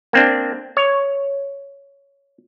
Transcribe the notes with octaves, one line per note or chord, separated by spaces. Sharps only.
A#3 C4 D4
C#5